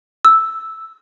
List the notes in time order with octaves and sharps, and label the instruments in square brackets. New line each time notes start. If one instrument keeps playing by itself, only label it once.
[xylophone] E6